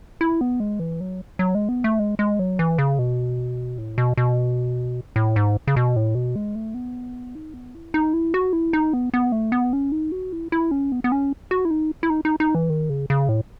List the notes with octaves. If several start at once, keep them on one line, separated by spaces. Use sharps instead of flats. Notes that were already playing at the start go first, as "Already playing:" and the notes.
E4
B3
G#3
E3
F#3
F#3
G#3
B3
A3
G#3
G#3
F#3
E3
C#3
B2
A2
B2
B2
A2
G#2
C#3
B2
A2
B2
G#3
A3
B3
D#4
B3
E4
D#4
E4
F#4
E4
D#4
B3
B3
A3
B3
C#4
D#4
F#4
E4
E4
C#4
B3
B3
C#4
F#4
E4
D#4
E4
D#4
D#4
D#4
E3
D#3
C#3
C#3
A2